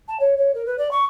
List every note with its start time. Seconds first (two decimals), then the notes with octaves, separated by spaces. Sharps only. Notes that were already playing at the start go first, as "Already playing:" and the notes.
0.08 A5
0.19 C#5
0.37 C#5
0.54 A#4
0.65 B4
0.78 D5
0.91 C#6